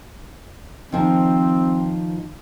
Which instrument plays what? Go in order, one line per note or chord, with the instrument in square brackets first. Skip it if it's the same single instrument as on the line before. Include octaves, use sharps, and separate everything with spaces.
[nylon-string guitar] D#3 F3 [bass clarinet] C4